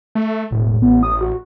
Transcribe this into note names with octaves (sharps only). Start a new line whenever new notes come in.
A3
E1 A2
A1 B3
D#6
F#4